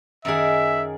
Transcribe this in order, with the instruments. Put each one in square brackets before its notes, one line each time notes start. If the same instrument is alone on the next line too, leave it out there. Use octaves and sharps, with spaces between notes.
[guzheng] F#2 D#3 G#4 [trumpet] E5